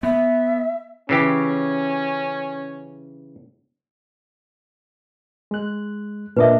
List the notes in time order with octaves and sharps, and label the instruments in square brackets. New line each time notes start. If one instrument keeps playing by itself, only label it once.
[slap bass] B3 [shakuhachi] E5
[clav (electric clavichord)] C#3 E3 G4 [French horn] C#4
[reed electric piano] G#3 F#6
[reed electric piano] A#2 D4 D#5 [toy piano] B4 E5